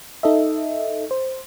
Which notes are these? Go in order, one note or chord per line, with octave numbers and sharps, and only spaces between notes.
D#4 A4 D#5 E5
C5